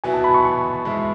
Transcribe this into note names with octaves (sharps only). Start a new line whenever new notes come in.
B2 F#3 B3 E4 G#5
A5
B5
C#6
C#6
G#2 G#3 B3 E4